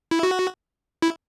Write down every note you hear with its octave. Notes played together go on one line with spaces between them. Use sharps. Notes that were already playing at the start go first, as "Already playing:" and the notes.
E4
F#4
E4